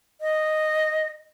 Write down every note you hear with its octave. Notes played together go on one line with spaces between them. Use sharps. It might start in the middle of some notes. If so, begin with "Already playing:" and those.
D#5